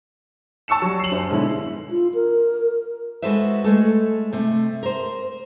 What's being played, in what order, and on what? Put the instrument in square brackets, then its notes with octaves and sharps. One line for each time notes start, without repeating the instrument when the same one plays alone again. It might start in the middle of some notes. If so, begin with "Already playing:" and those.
[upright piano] A5 C#6 E6 C#7 E7
F#3 G3
C7 F#7
F#2 C5
G#2 B2 D3 E4
[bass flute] F4
A#4
[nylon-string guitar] G#3 F#4 A4 B4 C5 E5
G#3 A3 A4
C3 A3
A#4 C5